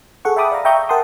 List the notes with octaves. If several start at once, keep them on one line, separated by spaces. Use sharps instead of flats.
G#4 A4 F#5 C#6
E5 G5 A5 B5 D6 D#6
D5 F5 A#5
E5 G5 A#5 C#6 D#6 G6
A#4 F#5 G5 A5 C6 D#6